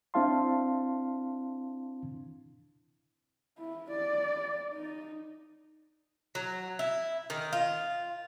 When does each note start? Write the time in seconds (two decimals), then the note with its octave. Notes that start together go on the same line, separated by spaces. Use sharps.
0.14 C4 D4 E4 F5 A5 C6
3.58 E4
3.90 D5
4.73 D#4
6.35 F#3
6.79 E4
7.30 D#3
7.53 F4